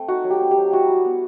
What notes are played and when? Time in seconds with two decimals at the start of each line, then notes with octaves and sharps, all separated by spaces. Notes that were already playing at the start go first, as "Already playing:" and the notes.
Already playing: A3 C4
0.08 D#4 F#4
0.24 F#3
0.30 G4
0.41 C4
0.51 G4
0.57 F#3
0.72 E4 F#4
0.88 G3
1.04 B3